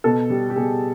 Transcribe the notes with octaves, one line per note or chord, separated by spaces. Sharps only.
B2 A4
G3
G4
B2 G#4